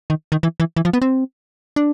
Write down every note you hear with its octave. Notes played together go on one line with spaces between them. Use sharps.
D#3
D#3
E3
E3
E3
F3
B3
C4
D4